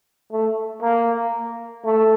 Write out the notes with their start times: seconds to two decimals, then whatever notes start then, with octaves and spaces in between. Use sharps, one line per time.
0.31 A3
0.82 A#3
1.85 A3